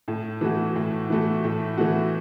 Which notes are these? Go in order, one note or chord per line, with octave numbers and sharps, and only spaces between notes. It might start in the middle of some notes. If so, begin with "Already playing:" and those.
A2
E3 A3 F#4
A2
E3 A3 F#4
A2
E3 A3 F#4